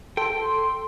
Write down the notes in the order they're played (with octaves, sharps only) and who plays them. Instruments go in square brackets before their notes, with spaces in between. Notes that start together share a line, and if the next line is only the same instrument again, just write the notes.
[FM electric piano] A4 [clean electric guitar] G5 [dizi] C6